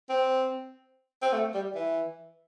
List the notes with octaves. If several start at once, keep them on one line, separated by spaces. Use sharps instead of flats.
C4
C4
A3
G3
E3